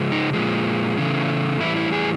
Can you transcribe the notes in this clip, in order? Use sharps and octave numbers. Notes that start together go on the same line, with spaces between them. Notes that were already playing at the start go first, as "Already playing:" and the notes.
Already playing: C#3 F3 G#3
D#4
A#2 F3 G#3
C#3 E3 A3
A2 E3 G3 E4
E4
G#4